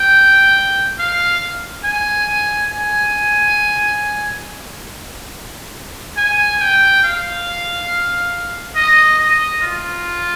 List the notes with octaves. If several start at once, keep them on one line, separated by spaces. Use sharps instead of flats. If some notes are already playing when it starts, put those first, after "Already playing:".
Already playing: G5
F5
G#5
G#5
G#5
G5
F5
D#5
D#5
F4